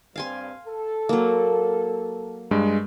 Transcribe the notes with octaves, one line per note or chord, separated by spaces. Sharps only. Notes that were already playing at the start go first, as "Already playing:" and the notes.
G2 G3 C4 F5 G#5 C6
A4
F#3 A#3
G2 G#3